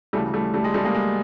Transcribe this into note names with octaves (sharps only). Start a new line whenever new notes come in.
D2 C#3 E3 G3 A3
G3 A3
G3 A3
G#3
G3 A3
G#3 A#3
G#3